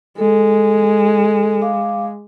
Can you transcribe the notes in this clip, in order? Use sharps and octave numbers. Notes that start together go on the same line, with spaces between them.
G#3 A4
F5 D6